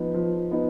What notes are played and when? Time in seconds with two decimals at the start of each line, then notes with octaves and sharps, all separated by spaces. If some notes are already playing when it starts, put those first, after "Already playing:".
Already playing: F3 B3 D#4
0.14 F3
0.51 B3 D#4